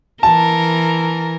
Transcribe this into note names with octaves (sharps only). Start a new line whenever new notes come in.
E3 A#4 A5